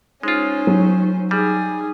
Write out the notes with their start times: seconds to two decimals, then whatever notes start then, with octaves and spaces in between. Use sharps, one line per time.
0.23 G#3 C#4 D#4 F4 C5
0.67 F#3
1.31 G3 D#4 G#4